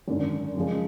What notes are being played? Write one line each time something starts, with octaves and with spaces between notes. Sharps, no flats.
G#1 F#2 D3
F#2 C#3 F3 G#3